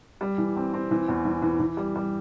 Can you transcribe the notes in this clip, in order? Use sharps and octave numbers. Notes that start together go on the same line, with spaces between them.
G3
E3
C4
C4
E3
E2
E3
E3
E3
G3
G3